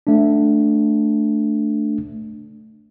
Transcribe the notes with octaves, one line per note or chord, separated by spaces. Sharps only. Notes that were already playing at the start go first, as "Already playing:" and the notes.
A3 D4